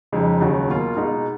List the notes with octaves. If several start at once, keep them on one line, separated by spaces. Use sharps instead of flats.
F2 C#3 G#3 D#4
D#2 C#3 F#3
B2 A#3 F4
B2 G#3 D#4